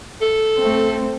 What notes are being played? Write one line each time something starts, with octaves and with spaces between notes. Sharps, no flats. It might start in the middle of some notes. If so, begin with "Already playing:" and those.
A4
A3 C4